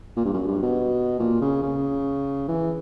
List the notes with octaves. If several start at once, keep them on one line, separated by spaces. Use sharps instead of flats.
A#2
G2
F#2
G2
B2
A#2
C#3
C#3
E3